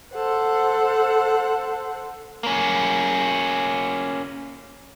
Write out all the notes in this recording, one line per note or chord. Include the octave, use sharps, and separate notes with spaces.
A4 C5 F#5
A#3 C#4